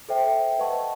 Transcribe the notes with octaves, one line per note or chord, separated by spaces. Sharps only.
A4 C5 E5 G5
B4 D#5 F#5 A5 C#6